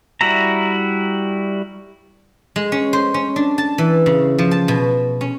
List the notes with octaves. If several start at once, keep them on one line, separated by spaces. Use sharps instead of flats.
G3 E4 F#4 E5 A#5
G#3
C#4
C5
C#4
D4
A5
E3
C#3
F3
A5
B2
C#4